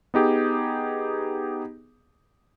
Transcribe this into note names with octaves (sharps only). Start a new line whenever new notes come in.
B3 D#4 G4 G#4